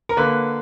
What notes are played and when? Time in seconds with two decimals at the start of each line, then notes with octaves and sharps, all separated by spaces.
0.09 A#4
0.17 D3 A#3 B4